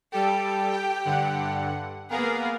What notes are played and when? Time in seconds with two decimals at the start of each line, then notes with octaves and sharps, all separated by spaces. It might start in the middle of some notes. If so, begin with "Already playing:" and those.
0.12 G3 G4 A4
0.70 G5
1.05 G2 D3 F#5
2.10 A#3 B3 G#4 A#4 F5